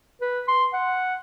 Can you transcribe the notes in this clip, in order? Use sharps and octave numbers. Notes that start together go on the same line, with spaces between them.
B4
C6
F#5